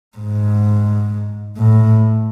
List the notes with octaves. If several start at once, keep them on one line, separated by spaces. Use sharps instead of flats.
G#2
A2